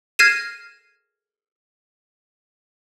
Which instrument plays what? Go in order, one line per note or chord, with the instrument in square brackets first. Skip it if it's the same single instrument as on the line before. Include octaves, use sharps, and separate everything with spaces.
[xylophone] F6 G#6 A#6 C7 D#7 E7